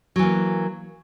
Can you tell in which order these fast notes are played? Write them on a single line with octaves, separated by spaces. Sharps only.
F#3 E3 A#3